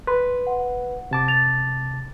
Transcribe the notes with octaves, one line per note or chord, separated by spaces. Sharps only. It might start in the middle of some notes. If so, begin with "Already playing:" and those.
B4 C6
F#5
C3 A5 D6
A6 F7